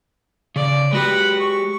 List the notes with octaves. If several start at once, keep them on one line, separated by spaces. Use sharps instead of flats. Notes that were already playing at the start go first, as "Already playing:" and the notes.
C#3 D5
G#3 F#4 G4 B4 F#5
C#6